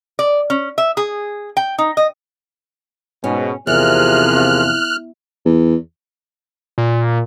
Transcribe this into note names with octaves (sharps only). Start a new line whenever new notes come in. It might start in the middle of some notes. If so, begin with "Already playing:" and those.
D5
C#4
E5
G#4
G5
D#4
D#5
G#2 B2 C#4
E2 C3 F3 F4 G#4 A#4 F6 F#6
E2
A#2